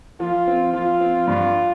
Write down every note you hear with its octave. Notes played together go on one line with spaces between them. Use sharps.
F3 F4
C4
F3 F4
C4
G2 F4